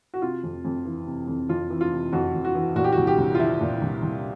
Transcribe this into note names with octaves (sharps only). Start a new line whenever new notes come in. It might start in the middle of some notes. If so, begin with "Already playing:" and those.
F#4
C3 F4
F2
F2
E3
C3
F2
F2 F4
E3
F4
C3
F2 F#4
F2
F#4
E3
A#2 F#4
G4
F#4
C2
G4
C2
F4
F3 E4
A#2
C2
C2